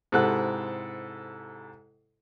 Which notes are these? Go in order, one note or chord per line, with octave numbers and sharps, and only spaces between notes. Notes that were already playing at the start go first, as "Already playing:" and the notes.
G#2 C3 E4 A4 F#5 F#6